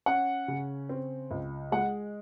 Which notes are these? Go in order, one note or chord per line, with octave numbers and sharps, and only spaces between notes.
C#4 F#5
C#3
C4
C#2
G#3 F#5